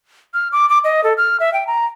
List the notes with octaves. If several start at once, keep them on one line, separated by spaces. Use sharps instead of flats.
F6
D6
D6
D#5
A4
F6
E5
G5
A#5